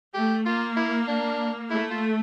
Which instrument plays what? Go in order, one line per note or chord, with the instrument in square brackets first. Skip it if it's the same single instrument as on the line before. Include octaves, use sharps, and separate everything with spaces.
[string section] A3 [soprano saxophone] G4
[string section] A#3 [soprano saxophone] F4
[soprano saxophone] E4
D4
[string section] A3 [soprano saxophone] E4
[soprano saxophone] F4